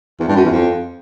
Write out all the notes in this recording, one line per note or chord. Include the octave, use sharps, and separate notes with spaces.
E2
G2
F#2
E2
F2